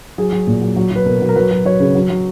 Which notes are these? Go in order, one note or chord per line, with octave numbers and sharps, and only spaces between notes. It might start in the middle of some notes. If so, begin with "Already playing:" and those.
F#3 G#4
F#3
A#2
F#3
F#3
F#3 B4
B2 A#4
F#3
A#4
F#3 B4
F#3
F#3 C#5
C#3
F#3
F#3